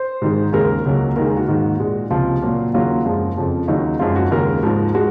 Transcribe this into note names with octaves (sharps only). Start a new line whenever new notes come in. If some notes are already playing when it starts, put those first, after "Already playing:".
Already playing: C5
G#2 D#3 G#3
D#2 C#3 G#3 A#4
C#2 C#3 F#3 A#3
D#2 D#3 G#3 A#4
G#4
F#4
G#2 D#3 A#3
A#2 G#3
C#2 C3 F3 F4
A#2 F#3 A#3
D#2 C#3 F#3 A#3 F4
F#2 F3 G#3 F4
F2 C#3 F3
D#2 C#3 F#3 D#4
F#2 F3 G#3 F4
F#4
D#2 C#3 G#3 A#4
G#2 F3 G#3
G#3 F#4